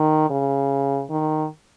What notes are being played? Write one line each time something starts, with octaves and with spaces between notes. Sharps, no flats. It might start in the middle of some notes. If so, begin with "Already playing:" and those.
Already playing: D#3
C#3
D#3